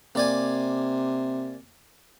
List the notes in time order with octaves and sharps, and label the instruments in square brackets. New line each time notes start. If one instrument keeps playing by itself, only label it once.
[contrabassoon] C3 [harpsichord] A#3 D5 G#5